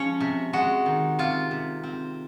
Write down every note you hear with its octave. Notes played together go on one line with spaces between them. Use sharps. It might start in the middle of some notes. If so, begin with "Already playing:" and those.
Already playing: F3 G#3 C#4 C#5
C3
G#3 F#4
D#3
C3 F4
C3
C4